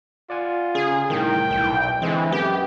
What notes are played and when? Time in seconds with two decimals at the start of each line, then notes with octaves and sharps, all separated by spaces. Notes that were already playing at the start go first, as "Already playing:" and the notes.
0.30 F4 D5 F#5 G#5
0.75 C#3 G#4
1.10 C2 A2 D#3 A#4 G5
1.50 B1
2.02 D3 E3 G#3 C4
2.32 F#2 B3 G4